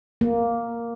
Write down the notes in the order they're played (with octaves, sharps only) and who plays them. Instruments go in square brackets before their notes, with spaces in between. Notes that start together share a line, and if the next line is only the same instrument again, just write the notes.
[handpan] A#3